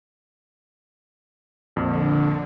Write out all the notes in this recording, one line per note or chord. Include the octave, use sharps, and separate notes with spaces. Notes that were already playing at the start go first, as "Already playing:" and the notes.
A#1 F2 D3